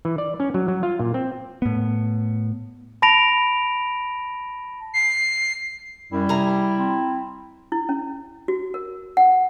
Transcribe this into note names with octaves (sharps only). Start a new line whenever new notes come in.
E3
D5
C#4
F#3
F#3
F4
A#2
C4
A2 B3
A5 B5 A#6 D7 F7
C7
F#2 G3 E4
C3 G#4 A#5
C4
E4
C#4
F#4
A#4
F#5